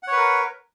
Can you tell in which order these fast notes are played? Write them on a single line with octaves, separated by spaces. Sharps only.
F#5 C#5 B4 A#4